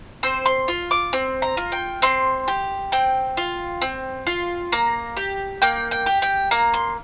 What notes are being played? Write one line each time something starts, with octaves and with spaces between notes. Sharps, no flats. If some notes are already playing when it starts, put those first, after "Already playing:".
C4 C5
C6
F4
D6
C4
A#5
F4
G5
C4 C6
G4
C4 G5
F4
C4
F4
A#3 A#5
G4
A#3 G5
G5
G4
G5
A#3 A#5
C6